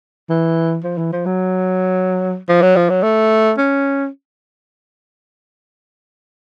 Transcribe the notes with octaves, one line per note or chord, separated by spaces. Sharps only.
E3
F3
E3
F3
F#3
F3
F#3
F3
F#3
A3
C#4